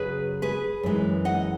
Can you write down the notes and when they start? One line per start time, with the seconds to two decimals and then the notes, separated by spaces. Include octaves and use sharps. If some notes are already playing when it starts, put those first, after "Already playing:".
Already playing: F#2 C#3 F#3 G#4 B4
0.42 G#4 B4
0.83 F#2 E3 G#3
1.25 D#5 F#5